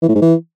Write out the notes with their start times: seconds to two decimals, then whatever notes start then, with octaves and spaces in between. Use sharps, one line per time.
0.02 E3
0.09 A2
0.15 G#2
0.22 E3